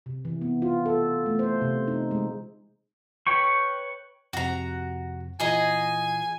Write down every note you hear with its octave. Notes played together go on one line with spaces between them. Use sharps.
C3
E3
B3
F4
A4
A3
C5
C3
D#4
G#3
B4 C#5 G5 C#6
F2 C3 F3 F#4 A#5
A#2 E3 F4 G#4 D#5 G#5 A#5